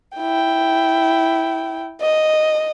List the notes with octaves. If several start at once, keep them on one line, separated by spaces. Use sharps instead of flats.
E4 G5
D#5